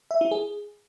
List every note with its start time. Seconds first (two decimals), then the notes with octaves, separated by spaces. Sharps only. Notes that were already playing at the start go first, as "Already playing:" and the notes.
0.11 E5
0.21 E4
0.31 G#4